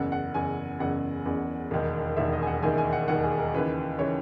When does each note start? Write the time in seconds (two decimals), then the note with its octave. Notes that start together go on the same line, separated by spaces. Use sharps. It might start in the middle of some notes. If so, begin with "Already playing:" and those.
Already playing: F#1 E2 C#3 F#5
0.12 F#5
0.34 F#1 E2 C#3 G#5
0.79 F#1 E2 C#3 F#5
1.26 F#1 E2 C#3
1.71 E1 D#2 D#3
2.17 E1 D#2 D#3 E5
2.33 D#5
2.42 G#5
2.47 F#5
2.63 E1 D#2 D#3 G#5
2.78 G#5
2.93 F#5
3.08 E1 D#2 D#3 F#5
3.23 G#4
3.39 A#4
3.54 D#2 C#3 E3 B4
3.99 C#3 E3 C#5